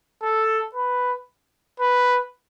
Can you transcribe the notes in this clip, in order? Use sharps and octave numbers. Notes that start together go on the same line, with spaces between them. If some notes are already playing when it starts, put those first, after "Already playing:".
A4
B4
B4